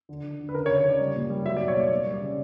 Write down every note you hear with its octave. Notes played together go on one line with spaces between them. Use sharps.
D3
D3
D3
B4
C#3 A#4
C#5
C#3
C#5
C#3 D5
G3
A#2
G3
F#3 E5
D5
B2
C#5
A#3 D5
A#3
G3
D5
C#3